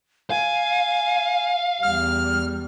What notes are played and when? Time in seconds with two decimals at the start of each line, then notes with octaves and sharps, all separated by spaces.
0.30 F5 G#5
1.83 E2 G3 F6